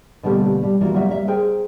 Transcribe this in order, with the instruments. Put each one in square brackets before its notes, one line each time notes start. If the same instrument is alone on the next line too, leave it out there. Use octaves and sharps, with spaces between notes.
[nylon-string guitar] B2 D3 G3 A3 A#3 G4
G3
E3 A#3 F4 F#4
C#3 F#3 G3 A#3 E5
A#3 E5
G#4 A#4 C5 G5